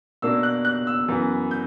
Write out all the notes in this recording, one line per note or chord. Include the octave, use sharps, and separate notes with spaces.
B2 A#3 D4 E6
F#6
F#6
E6
F#2 E3 B3
G6